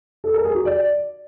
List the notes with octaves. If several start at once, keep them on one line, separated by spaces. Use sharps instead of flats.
A4
A#4
G#4
F#4
D5